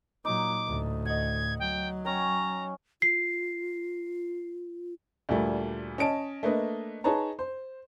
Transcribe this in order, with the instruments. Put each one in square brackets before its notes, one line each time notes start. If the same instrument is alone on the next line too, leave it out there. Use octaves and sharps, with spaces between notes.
[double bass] A#2 F#3 [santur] D#4 [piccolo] D6
[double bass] D2 A2
[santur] D#5 F#5 [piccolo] G#6
[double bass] F#3 [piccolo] G5
[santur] C#4 C#5 G5 [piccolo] A#5
[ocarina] F4 [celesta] C7
[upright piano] D2 A#2 G3 A3 A#3
C#4 D#5 A5 D7
A3 A#3 D4 B4 D#5
D#4 G#4 B4 C#5 A5 A#5
C5